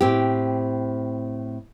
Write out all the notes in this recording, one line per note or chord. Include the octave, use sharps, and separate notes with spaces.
A2 C4 G4